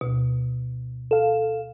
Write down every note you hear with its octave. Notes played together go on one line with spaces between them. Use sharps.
D2 B2
A4 F5